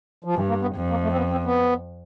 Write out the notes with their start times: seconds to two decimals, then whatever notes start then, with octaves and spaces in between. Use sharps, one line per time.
0.24 F3
0.35 G2 E3
0.49 A#3
0.62 B3
0.76 F2
0.90 A#3
1.03 A3
1.12 C4
1.17 B3
1.32 C4
1.45 B3